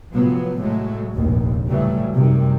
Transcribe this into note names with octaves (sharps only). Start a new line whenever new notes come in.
A2 C3 F3 F#3 B3
A2 F#3 G#3 A3
F1 A#1 D#2 G#2
A2 C#3 E3 F#3 G3 A3
F#2 C3 D#3 G3